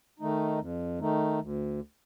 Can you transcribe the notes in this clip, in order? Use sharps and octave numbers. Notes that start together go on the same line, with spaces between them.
D#3 A3 D#4
F2
D#3 A3 D#4
D2